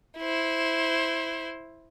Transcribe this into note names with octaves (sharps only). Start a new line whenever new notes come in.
E4 C5